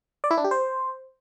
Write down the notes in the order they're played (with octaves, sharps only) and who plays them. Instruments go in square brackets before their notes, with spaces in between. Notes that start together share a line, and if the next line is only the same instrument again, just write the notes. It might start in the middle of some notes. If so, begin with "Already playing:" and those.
[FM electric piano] D5
E4
D4
G4
C5